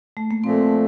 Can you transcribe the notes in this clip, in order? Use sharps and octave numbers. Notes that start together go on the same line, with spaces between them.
A3
A#3
A#2 F3 A3 C4